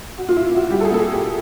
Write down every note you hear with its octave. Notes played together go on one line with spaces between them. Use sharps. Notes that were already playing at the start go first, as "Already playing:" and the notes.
F#4
A#2 F4
E4
F4
A#2
F#4
G3 G4
A4
G#4
A#3 A4
G#4
A#2 G4